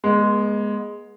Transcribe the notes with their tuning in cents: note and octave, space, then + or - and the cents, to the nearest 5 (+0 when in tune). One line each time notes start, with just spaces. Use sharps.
G#3 +0 B3 -35